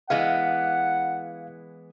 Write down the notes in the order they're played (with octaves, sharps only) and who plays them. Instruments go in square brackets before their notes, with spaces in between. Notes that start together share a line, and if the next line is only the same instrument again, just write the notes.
[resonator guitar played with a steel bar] E3 G#3 B3 [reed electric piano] F5 [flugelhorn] F#5